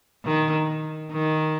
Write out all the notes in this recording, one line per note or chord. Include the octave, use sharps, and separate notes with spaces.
D#3
D#3